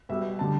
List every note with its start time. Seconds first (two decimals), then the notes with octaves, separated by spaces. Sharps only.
0.09 B2 G3 E5
0.39 D3 G3 A5